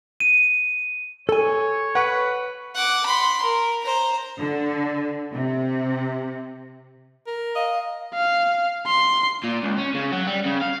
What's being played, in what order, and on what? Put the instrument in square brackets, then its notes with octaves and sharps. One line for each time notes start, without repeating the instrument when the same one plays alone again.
[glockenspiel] D#7
[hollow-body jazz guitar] A4 G#5 [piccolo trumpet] C#5
[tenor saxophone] B4 [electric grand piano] F#5 C#6
[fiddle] F#5 D6
B5 C6
A#4
C5 A#5
[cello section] D3
C3
[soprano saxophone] A#4
[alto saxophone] D#5 [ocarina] F5
[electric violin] F5
C6
[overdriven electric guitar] A#2
C#2
C#4
C#3
F#3
G3
C#3
F5